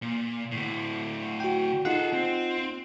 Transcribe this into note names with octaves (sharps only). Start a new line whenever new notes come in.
A#2
D2 A2
F#4 G5
D#4 F4 G#4 A4 F#5
C4